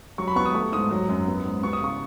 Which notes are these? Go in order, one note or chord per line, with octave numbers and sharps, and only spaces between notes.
F#3 C#6
B5
B3 C#6
D#6
A3 C#6
G#2 D#6
F#3
F#2
B3
G#2
B3 C#6
D#6
C#3 C#6